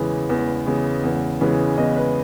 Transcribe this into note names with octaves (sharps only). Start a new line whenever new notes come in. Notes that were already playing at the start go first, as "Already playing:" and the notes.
Already playing: E2 C#3 E3 G#3 B3
E2
C#3 E3 G#3 B3
E2
C#3 E3 G#3 B3
E2 D#5
B4